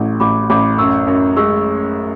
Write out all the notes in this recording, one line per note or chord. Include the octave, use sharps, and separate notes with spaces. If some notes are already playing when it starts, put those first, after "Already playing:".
Already playing: A1 A2
A1 B5 D6
A1 B5 D6
F#2 C#6 E6
F#2
G#3 C#6 E6